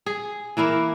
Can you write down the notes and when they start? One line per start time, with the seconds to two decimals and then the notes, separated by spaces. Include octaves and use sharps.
0.06 G#4
0.57 E3 A#3 E4 A#4